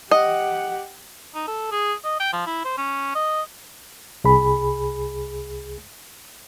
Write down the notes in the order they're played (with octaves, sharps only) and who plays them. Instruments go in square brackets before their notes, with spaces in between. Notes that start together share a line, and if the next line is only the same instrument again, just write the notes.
[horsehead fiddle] G4 F#5 [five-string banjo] D#5
[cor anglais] D#4
A4
G#4
D#5
G5
F3
E4
C5
C#4
D#5
[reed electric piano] C2 G#4 B5